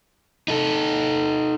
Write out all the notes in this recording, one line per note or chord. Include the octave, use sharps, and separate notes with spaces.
D#4 A4